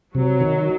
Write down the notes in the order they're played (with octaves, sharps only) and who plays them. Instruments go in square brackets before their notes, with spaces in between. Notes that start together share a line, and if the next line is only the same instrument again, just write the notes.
[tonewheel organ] C3 [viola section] F#3
[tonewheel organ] D#3